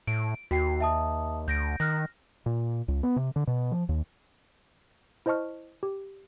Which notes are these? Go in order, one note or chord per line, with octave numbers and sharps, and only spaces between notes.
A2 D7
D#2 F#4 G5 C7
E5 A5 D#6
D2 G6 A#6 D7
D#3 F6 F#6 A#6
A#2
C#2
B3
C3
D3
B2
F3
D#2
E4 C5 D#5 A5 C#6 F6
G4